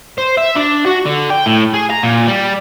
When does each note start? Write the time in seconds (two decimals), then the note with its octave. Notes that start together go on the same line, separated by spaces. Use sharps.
0.18 C5
0.38 E5
0.56 D4
0.86 F#4
1.05 D3
1.30 G5
1.46 A2
1.74 G#4
1.90 A#5
2.03 A#2
2.27 G3